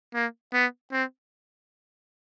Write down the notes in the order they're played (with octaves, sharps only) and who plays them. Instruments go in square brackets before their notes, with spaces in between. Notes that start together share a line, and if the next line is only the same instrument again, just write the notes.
[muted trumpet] A#3
B3
C4